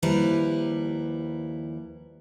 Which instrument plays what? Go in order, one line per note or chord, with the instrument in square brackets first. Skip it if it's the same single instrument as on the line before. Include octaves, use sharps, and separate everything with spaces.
[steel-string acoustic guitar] D#2 F3 G3 E4 B4 A#5